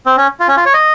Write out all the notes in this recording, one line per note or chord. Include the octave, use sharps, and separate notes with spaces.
C4
C#4
F4
C#4
F4
C#5
D#5